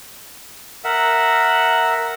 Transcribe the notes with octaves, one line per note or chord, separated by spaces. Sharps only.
A#4 E5 F#5